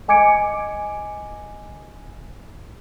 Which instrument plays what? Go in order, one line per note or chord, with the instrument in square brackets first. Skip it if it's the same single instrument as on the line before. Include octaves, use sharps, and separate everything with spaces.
[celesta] D#5 G#5 D6 G#6 C#7 D7